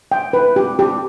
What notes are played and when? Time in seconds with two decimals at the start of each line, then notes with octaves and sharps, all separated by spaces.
0.12 G5
0.33 B4
0.56 G4
0.79 G4